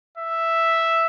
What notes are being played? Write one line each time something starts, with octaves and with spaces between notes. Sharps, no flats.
E5